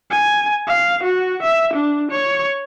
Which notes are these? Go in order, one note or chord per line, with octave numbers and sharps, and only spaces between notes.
G#5
F5
F#4
E5
D4
C#5